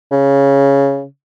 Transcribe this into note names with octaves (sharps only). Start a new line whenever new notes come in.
C#3